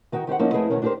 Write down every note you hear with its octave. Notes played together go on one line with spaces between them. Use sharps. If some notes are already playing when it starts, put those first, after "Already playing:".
D#3 D#4 F#4 D#5 G5
D#3 G4 C5 F#5
F3 A#3 C#4 D#4 E4
F2 A3 E4 G#4 B4 D#5
D2 G2 B2 D#3 C#4 A#4
D4 F#4 G4 A4 A#4 C5